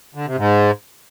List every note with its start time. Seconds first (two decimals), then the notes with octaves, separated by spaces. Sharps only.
0.15 D3
0.26 C3
0.38 G#2